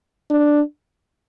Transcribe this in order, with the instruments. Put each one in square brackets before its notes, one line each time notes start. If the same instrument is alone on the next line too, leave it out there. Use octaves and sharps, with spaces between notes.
[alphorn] D4